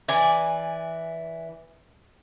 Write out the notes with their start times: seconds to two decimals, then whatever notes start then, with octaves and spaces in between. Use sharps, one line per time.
0.08 E3 D5 G#5